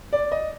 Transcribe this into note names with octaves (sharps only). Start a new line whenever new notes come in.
D5
D#5